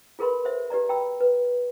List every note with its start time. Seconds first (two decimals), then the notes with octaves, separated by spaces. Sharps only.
0.19 F4 G#4 A#4 B4 B5 C6
0.45 C5 E5
0.70 G4 B4 D5 A#5
0.89 G5 A#5 B5 E6
1.21 B4